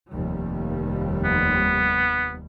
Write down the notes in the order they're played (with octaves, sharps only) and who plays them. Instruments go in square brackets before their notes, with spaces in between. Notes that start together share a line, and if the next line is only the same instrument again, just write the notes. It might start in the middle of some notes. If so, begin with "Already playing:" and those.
[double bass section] F1 D#2 G3
[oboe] B3